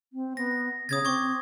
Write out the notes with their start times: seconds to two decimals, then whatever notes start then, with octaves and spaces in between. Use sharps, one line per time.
0.13 C4
0.37 B3 A#6
0.89 C#3 D#6 G#6 A6
1.05 C4 C#6 D6 G#6